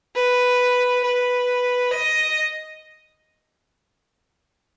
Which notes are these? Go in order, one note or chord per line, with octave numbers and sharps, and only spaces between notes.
B4
B4
D#5